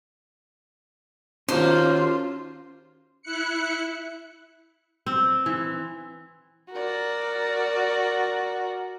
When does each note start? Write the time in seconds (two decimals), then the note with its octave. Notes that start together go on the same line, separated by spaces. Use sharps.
1.49 D#2 A#3 C#4 F4 F#4 C5 A#5
3.22 E4 F#6 C#7
5.06 C4
5.46 E3
6.72 F#4 A#4 D5